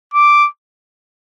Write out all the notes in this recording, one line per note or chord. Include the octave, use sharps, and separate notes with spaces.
D6